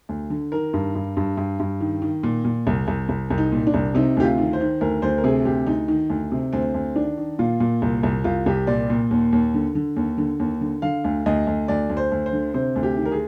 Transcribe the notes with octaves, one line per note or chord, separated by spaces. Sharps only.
D2
D3
D#3 A#4
G2
G2
G2
G2
G2
D#3
D#3
A#2
A#2
C2
C2
C2
C2
D#4
A#2
D4
C2
C3 D#4
D2 G4
F4
D#3
C5
D#3
D2 A#4
D2 C5
A#4
C3 G#4
D2 G4
D2 D#4
D#3
D2
C3
D2 C4
D2
D#3 D4
D#3
A#2 F4
A#2
C2
C2
C2 F4
C2 G4
A#2 D5
A#2
D#2
D#2
D3
D3
D#2
D3
D#2
D3
D3 F5
D2
D2 D#5
D2
D2 D5
D2
C5
D2
C5
D3
C3 C5
D2
G4
D#3
A#4
G#4